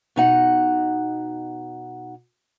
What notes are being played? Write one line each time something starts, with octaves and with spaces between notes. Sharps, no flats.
B2 D#4 F#5